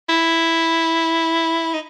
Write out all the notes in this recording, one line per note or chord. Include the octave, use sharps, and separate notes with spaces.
E4
D#4